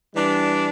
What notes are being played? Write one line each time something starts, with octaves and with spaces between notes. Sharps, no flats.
E3 G3 D4